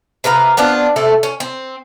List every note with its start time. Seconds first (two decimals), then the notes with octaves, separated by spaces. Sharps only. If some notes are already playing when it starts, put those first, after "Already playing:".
0.24 C3 B4 F5 A#5
0.57 B3 C4 D4 F4
0.96 C3 A3 A4
1.23 C#4
1.40 C4